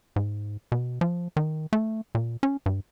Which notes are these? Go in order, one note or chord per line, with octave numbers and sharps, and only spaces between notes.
G#2
B2
F3
D#3
A3
A#2
C#4
G2